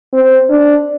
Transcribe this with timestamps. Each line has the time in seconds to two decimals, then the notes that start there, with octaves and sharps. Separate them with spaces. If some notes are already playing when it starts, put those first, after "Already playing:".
0.13 C4
0.50 D4